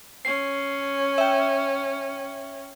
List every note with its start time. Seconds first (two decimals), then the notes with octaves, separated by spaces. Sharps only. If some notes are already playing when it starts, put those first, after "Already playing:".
0.25 C#4 C7
1.18 E5 G5